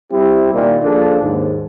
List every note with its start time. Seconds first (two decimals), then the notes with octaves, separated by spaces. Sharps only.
0.11 G3 C4 E4 G4
0.54 A#2 D#3
0.83 A#1 F3 A#3 D4 G#4 A4
1.21 D#2 G#2